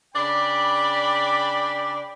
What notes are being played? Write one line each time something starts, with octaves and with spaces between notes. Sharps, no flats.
C#3 D4 D5 G5 B5